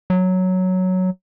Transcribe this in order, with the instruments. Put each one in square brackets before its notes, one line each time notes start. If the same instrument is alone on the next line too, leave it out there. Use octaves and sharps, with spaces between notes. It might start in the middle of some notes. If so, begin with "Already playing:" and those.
[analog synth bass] F#3